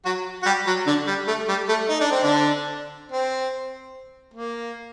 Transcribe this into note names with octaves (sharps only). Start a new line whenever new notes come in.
F#3 F#4
F#4
G3 G4
F#3 F#4
D3 D4
G3
A3
G3
A3
D#4
D4
C4
D3 D4
C4
A#3